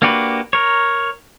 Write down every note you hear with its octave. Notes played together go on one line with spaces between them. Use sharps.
A#3 D4 F#4 G4 B4
A#4 C#5